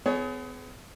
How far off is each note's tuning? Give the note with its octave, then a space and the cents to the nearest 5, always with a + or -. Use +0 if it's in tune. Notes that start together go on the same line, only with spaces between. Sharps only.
B3 +40 G#4 +30 C#5 +0